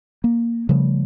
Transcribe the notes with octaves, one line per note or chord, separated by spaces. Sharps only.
A#3
C#3 F3 G3 A3